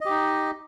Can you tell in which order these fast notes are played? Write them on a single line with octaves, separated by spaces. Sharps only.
D#5 G4 D#4